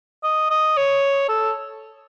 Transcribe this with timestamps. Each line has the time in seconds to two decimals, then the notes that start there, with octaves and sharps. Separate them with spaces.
0.23 D#5
0.50 D#5
0.77 C#5
1.29 A4